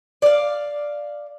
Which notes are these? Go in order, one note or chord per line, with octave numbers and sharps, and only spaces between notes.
D5 F5